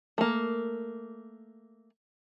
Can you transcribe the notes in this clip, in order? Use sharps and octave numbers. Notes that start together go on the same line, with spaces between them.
A3 A#3